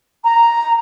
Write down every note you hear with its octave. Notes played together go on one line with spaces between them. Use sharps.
A#5